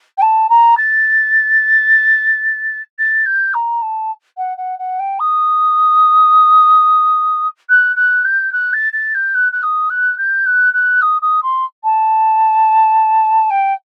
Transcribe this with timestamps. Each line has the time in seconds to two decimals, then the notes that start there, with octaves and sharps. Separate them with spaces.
0.18 G5
0.22 A5
0.49 A#5
0.77 A6
2.99 A6
3.26 G6
3.54 A#5
3.82 A5
4.37 F#5
4.57 F#5
4.79 F#5
4.99 G5
5.19 D#6
7.69 F#6
7.96 F#6
8.24 G6
8.52 F#6
8.73 A6
8.93 A6
9.15 G6
9.34 F#6
9.52 F#6
9.63 D#6
9.90 F#6
10.18 G6
10.46 F#6
10.73 F#6
11.02 D#6
11.22 D#6
11.43 C6
11.84 A5
13.50 G5